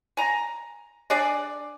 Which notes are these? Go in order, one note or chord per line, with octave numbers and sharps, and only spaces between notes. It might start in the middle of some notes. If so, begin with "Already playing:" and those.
G#5 A#5
D4 G#4 D5